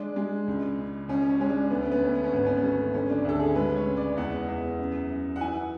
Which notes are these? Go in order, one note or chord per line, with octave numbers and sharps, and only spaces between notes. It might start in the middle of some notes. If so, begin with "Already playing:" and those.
Already playing: G#3 D4
G#3
C#2
C#3
C#2 C#4
C#4
G#3 C#4
D4
D2 B3
C#4
B3
D2 C#4
B3
C#4
G#1 B3
C#4
B3
A3
D3 C#4
D4
D2 A4
G#4
G#3 B4
C#5
C#3
D5
E2 F#5
E2
F#2
F#2
F#5
E3 G#5